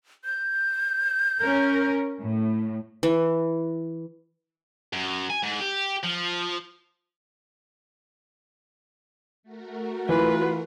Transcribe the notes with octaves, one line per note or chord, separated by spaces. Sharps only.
G6
C#4 A#4
A2
E3
F#2
G#5
G#2
G4
F3
A3 F#4 A#4
E3 F4 B4